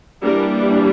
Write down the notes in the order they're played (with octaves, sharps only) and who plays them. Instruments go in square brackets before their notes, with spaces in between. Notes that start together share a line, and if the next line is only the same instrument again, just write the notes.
[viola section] E3 G3 A#3 D4 A#4